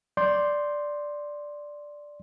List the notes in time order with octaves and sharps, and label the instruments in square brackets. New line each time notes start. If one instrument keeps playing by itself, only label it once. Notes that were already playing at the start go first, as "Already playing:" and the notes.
[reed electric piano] D5 C6 G6